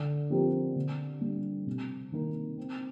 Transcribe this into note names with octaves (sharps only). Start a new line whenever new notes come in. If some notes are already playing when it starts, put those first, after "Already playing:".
Already playing: D3
F3 C4 G4 A#4
D3
G3 D4
C3
D#3 A#3 D#4 A#4
C4